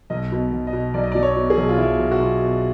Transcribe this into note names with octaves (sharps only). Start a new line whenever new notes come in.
B1 D#5
B2
B1
D#5
B2
B1 D5
D#5
D5
F#3
C#5
B2
G#4
B1
F4
B1 E4
B1
F#4
B1 F4
B2